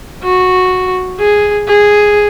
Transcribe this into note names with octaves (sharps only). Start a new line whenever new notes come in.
F#4
G#4
G#4